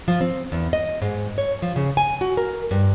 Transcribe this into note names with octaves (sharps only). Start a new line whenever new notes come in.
F3
C4
E2
D#5
G#2
C#5
F3
C#3
G#5
F#4
A#4
G2